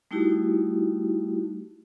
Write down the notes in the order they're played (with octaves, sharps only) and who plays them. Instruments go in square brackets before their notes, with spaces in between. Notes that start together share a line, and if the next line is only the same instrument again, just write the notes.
[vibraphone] G3 A3 D#4 E4 F#4 G4